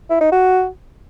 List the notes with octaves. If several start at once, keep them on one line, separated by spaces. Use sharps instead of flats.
E4
D#4
F#4